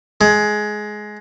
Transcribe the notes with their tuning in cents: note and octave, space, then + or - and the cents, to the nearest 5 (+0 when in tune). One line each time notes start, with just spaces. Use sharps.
G#3 +15